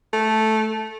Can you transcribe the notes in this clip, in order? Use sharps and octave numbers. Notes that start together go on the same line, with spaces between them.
A3